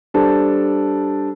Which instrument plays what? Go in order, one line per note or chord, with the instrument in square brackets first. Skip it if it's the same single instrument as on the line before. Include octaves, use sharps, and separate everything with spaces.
[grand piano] G3 D4 A4 C5